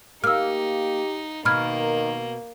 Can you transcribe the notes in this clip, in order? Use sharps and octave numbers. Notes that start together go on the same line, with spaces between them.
A#3 D#4 G4 E6 F6
B2 D#3 A#3 B5 F6 G#6